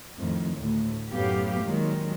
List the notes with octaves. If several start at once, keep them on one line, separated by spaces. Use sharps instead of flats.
F2 A2 D#3
D2 A2
F#2 A2 F#3 B3 G4 F5
A#2 D#3 F#3 G#3